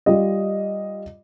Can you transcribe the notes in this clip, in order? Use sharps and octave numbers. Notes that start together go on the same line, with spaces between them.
G3 F4 D#5